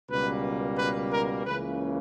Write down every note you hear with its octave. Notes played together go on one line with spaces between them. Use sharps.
C#2 B2 G3 A#3 B4
B4
A#4
C#2 C#3 E3 A#3 B4